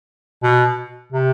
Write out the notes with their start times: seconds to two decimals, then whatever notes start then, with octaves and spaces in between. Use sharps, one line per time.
0.43 B2
1.12 C3